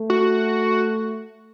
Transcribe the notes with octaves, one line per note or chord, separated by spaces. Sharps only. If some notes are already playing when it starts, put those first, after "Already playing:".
Already playing: A3
F#4